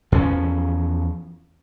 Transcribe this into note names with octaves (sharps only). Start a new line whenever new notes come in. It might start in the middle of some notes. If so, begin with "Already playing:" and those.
E2 F3 G#3 C#4